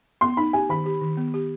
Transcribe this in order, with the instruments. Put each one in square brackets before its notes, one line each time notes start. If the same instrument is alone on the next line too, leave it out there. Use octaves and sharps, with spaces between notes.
[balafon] B3 [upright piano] C6
[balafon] D#4 [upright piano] B5
[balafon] G4 [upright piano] G#5
[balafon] D#3 [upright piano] B5
[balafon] G4
D#3
B3
G4